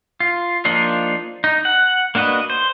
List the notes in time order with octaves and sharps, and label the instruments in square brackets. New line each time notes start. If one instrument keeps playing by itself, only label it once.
[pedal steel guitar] F4
F3 A#3 D4 D#4 F4
D#4
F#5
A#3 D4 F#4 B4 D#5
C5